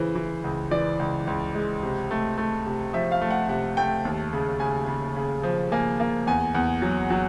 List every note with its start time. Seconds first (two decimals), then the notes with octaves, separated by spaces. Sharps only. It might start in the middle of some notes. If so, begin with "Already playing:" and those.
Already playing: C#3 E3 C5
0.15 E3
0.44 C#2
0.71 E3 D5
0.99 C#2
1.27 C#2
1.55 G#3
1.83 C3
2.11 A3
2.38 A3
2.66 C3
2.93 F3 E5
3.12 F5
3.21 A3
3.31 F#5
3.49 C3 F#5
3.77 A3 G5
4.05 D#2
4.33 C#3
4.60 C#3 G#5
4.88 C#3
5.16 C#3
5.43 F3
5.72 A#3 G#5
6.00 A#3
6.27 E2 G#5
6.55 E2
6.82 F#3
7.10 F#3